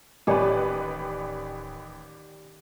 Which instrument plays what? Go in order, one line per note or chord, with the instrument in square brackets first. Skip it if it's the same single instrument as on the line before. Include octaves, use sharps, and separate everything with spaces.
[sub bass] D1 [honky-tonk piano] A1 B4 [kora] D#3 C#5 [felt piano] G4 D5 G#5